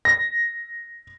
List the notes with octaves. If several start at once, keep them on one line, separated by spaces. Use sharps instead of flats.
A#6